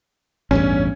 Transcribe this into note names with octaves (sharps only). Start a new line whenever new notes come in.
A1 E2 G2 C#4